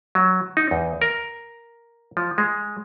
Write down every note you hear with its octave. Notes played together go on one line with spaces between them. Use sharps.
F#3
D#4
E2
A#4
F3
G#3